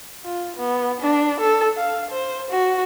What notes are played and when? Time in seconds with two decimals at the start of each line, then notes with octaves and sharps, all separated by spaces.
0.25 F4
0.57 B3
1.01 D4
1.40 A4
1.77 F5
2.11 C5
2.51 F#4